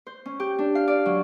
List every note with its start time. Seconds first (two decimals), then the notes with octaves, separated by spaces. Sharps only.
0.07 C5
0.26 C#4
0.40 G4
0.59 D4
0.75 F5
0.88 D5
1.06 F#3